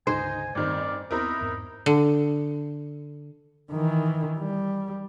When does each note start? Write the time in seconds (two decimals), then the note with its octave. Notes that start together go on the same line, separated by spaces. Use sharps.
0.07 D2 G#2 C#3 D#4 C5 G#5
0.55 A1 G2 D#3 C4 D5
1.11 D#2 B3 C4 D#4 E4 A#4
1.41 E2 G#2 B3
1.86 D3
3.72 D#3 E3
4.38 G3